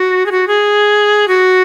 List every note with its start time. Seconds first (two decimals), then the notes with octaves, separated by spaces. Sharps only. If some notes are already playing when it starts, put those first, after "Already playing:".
Already playing: F#4
0.26 G#4
0.31 F#4
0.48 G#4
1.28 F#4